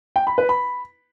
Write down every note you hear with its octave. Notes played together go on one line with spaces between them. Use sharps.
G5
B5
B4
B5